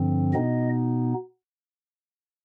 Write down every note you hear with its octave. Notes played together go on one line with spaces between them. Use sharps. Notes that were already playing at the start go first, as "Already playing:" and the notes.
Already playing: G2 D3 F3 C4
B2 B3 D#4 D#5